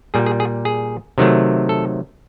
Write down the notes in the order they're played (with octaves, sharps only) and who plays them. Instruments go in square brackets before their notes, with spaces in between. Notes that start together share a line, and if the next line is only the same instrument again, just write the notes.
[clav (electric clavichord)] A#2 G3 G#4
G#4
G#4
G#4
C3 D#3 F#3 A3
A4